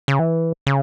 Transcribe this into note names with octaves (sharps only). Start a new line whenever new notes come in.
C#3
E3
C#3